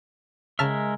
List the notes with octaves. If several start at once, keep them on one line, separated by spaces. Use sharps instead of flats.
C#3 G#3 A#4 E5 A5 F6